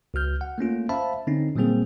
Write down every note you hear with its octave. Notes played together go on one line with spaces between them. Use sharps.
C#2 F#4 F6 G6
F#5
A3 A#3 C#4 F4
C5 E5 F5 A5 B5
D3 C4 C#4 D#4
A#2 F#3 G3 A#3 C4 G#4